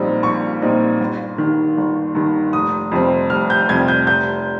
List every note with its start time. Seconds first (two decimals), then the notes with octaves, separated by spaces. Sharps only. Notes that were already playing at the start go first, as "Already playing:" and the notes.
Already playing: A#1 A#2 G3 C4 D#4
0.23 A#1 C#6
0.62 A#2 G3 C4 D#4
1.00 G1
1.38 G2 D#3
1.78 G1
2.15 G2 D#3
2.53 F1 D#6
2.91 F2 C3 G3 C4
3.30 F1 F6
3.50 G6
3.68 F2 C3 G3 C4 G#6
3.88 G6
4.07 F1 G6